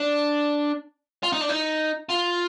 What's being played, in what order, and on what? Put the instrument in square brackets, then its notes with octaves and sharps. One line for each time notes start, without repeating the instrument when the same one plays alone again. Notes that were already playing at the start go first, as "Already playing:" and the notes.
Already playing: [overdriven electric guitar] D4
F4
D#4
D4
D#4
F4